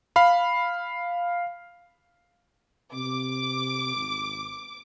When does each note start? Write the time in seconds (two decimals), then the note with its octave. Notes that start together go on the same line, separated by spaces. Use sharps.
0.16 F5 B5
2.93 C3 D6
3.96 G#1